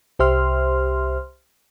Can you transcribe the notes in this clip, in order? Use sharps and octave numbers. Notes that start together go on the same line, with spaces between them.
C2 G4 C5 E5 C6 F6